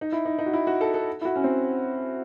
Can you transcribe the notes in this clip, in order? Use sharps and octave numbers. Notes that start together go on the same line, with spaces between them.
D#4
E4
D#4
D#4
F#4
E4
F#4
A4
A4
E4
F#4
C#4
C4